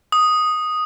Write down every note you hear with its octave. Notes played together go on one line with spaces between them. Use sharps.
D#6